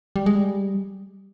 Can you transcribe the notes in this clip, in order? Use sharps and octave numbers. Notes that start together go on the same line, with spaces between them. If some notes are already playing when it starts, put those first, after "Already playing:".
G3
G#3
G3